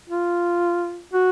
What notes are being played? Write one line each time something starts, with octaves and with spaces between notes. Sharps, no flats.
F4
F#4